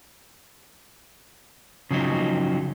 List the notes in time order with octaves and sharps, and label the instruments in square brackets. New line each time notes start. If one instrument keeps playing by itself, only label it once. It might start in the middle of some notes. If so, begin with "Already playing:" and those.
[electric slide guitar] C#3 F3 F#3 D#4